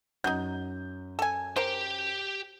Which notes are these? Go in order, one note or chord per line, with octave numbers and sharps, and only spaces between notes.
F#2 F#3 D#4 G6
A4 G#5
G4 A#4 C5 G5